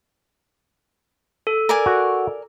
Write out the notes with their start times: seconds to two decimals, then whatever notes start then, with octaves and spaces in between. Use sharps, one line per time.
1.47 A4
1.69 A#4 D5 G#5
1.86 F#4